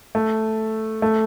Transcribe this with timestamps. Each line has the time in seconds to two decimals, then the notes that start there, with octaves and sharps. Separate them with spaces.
0.15 A3
1.02 A3